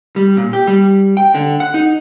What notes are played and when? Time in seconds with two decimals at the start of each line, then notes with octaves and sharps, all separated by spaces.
0.16 G3
0.37 A#2
0.53 G4
0.67 G3
1.17 G5
1.35 D3
1.60 F#5
1.74 D#4